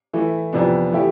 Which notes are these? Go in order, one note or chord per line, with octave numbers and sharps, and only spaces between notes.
E3 A3 E4
F2 C3 E3 B3 D4
E3 A3 E4 G4